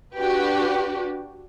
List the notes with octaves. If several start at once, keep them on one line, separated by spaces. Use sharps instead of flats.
D4 F#4 G4 B4